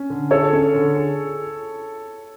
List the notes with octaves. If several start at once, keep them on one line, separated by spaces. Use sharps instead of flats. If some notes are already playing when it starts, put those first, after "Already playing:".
Already playing: C#4
D3
G#4 A4 C#5
C#4
D3
G#4